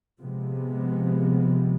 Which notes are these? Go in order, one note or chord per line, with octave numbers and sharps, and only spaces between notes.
C3 F3 G#3 B3